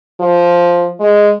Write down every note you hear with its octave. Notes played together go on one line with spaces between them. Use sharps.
F3
G#3